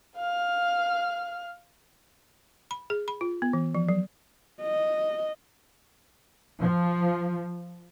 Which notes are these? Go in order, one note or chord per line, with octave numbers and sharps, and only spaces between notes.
F5 F6
B5
G#4
B5
F4
B3
E3
F3
F#3
D#5
F3